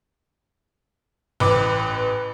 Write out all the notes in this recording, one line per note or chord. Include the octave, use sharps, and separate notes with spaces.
A1 B4 D6